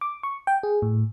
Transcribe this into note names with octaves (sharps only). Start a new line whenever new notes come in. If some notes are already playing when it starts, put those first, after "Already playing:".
D6
C#6
G5
G#4
A2